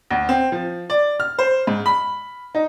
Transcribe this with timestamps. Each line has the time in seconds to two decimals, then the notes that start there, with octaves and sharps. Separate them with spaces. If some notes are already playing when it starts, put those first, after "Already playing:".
0.11 D2
0.29 C4
0.52 F3
0.90 D5
1.20 F6
1.39 C5
1.67 G#2
1.86 B5
2.55 D#4